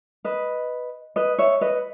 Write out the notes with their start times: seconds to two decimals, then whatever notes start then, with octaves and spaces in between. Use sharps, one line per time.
0.25 B4 D#5
1.16 B4 D#5
1.38 C#5 E5
1.61 B4 D#5